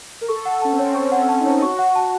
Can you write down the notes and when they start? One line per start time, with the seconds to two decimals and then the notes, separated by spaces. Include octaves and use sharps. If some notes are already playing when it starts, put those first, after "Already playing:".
0.21 A#4
0.28 A4 C#6
0.45 F#5
0.62 C#4 A5
0.73 C4
0.79 C#5
0.90 C#4
0.95 C4 C#6
1.12 F#5
1.17 C#4
1.29 A5
1.35 C#4
1.40 D#4
1.45 C#5
1.62 F#4 C#6
1.79 F#5
1.96 A5